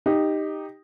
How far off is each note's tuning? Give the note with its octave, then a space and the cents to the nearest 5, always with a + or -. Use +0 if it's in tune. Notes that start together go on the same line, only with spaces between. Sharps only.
D#4 -5 G4 +10